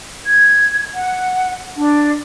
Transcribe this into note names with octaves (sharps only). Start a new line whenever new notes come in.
G#6
F#5
D4